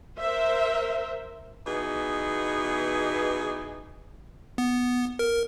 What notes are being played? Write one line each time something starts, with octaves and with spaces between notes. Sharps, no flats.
A#4 C5 E5
B2 E3 B3 D#4 G#4
B3
A#4